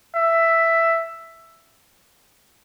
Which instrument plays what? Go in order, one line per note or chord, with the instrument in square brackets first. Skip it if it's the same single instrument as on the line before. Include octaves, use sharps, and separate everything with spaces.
[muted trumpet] E5